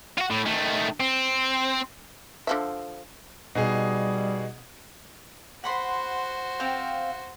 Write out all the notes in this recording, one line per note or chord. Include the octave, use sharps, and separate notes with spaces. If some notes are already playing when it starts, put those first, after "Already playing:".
F4 F#4
A2
D#3 A3
C4
D3 F3 E5
B2 G3 D#4 G#4
F#4 C5 F#5 B5 C6
C4 F5 G5